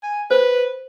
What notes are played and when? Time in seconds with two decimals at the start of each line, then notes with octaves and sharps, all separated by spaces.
0.03 G#5
0.31 B4 C5